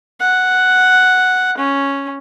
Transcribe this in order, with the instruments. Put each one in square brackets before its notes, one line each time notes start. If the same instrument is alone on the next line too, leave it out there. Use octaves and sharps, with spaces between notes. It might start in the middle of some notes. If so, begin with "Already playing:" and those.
[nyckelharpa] F#5
C#4